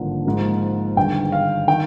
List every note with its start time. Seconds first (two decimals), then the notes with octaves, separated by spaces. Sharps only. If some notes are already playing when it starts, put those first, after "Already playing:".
Already playing: G#1 G2 D3 F3 A#3
0.25 G#2 F3 A#3
0.97 G1 G2 D#3 G#3 G5
1.32 F5
1.68 D#3 G5